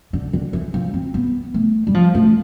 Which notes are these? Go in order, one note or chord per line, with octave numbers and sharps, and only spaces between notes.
D3
D3
E3
F3
C4
B3
A3
G3
F3
A3